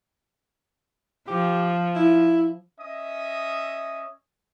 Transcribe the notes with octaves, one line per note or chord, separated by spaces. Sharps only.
F3 G4
E4
C#4 D#5 E5 D#6